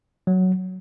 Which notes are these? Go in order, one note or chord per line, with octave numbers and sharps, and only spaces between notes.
F#3